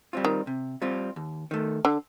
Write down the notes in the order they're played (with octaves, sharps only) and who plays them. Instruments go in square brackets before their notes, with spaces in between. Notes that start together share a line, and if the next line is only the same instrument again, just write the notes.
[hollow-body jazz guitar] G3 C4 F4
[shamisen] D#3
[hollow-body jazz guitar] C3
G3 C4 F4
D#2
D#3 A3
[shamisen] D3